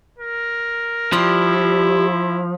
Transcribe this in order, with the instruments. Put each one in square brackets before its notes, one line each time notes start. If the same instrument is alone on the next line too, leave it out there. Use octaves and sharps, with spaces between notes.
[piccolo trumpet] A#4
[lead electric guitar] F3 [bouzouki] G3 G4 [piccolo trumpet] E4